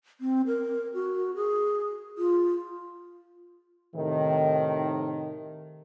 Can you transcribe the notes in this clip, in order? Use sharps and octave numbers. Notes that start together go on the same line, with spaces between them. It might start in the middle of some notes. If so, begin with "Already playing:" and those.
C4
A#4
F#4
G#4
F4
A2 C3 D#3